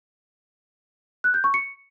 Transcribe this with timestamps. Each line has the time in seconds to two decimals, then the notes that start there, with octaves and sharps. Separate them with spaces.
1.24 F#6
1.34 G6
1.44 C#6
1.54 C#7